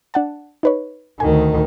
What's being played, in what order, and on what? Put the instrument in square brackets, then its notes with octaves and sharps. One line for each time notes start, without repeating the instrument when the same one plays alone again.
[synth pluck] D4 F#5 A5
D#4 B4 C#5
[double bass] D2 D#3 [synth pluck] G#5